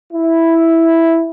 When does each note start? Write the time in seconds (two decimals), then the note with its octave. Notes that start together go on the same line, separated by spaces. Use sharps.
0.12 E4